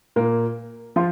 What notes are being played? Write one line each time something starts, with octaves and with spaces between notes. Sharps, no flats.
A#2 A#3
F3 F4